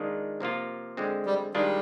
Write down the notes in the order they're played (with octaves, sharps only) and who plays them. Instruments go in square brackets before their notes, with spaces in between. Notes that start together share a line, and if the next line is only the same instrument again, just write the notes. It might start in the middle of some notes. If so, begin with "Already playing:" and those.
Already playing: [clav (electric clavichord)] D#3 G#3 D4 F4
C3 F3 A#3 F4
D3 G#3 C4
[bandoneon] G3
[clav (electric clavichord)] D#3 G#3 D4 F4 [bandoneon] G3